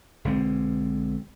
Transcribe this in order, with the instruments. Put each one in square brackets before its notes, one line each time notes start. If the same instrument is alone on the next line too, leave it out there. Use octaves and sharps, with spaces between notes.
[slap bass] B1 D3 G#3 C4